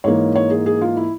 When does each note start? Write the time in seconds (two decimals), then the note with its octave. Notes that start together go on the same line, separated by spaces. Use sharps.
0.04 G#2 E3 A#3 C#5
0.36 C#5
0.51 G#4
0.66 G#4
0.81 F4
0.97 E4